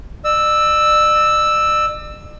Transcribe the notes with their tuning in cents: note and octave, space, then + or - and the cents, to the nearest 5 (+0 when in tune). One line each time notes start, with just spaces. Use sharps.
D5 +45 E6 +0